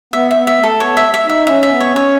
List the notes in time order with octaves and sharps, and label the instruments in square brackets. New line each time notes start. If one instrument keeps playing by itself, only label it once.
[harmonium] B3 [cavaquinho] E5
[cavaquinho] E5
[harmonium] B3
[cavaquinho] E5
[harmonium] A3
[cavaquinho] A4
[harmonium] B3 [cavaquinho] C#5
[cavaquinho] E5
E5
[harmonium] D#4 [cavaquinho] E5
[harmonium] C#4 [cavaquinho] E5
[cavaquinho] E5
[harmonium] B3
[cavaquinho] C#5
[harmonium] C#4
[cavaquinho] C#5